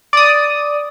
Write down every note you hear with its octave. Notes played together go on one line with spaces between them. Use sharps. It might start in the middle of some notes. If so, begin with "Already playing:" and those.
D5 D#6